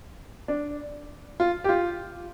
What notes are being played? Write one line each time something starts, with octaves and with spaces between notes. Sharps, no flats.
D4
F4
G4
F4